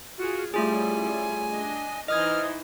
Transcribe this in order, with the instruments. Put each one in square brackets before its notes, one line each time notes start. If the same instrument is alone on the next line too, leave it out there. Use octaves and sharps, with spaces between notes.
[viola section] F4 G#4 [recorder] F#4
[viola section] G3 C#4 E4 [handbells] A3 F4 G#4 [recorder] G#5
[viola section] D4 D#5
[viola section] E3 D#4 C5 [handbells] D#5 D#6 G#6 [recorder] F6